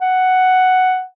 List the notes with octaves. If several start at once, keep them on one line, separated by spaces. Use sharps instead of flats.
F#5